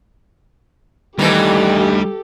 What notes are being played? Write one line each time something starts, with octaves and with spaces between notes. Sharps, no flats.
D2 D#3 E3 G3 D#4 G4 A4